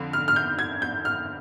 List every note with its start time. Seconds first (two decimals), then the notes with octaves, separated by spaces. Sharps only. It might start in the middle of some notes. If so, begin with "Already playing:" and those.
Already playing: F2 D3
0.13 F6
0.28 F6
0.36 G6
0.59 G#6
0.82 G6
1.05 F6